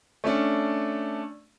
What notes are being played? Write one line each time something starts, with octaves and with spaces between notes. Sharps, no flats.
A3 C#4 D4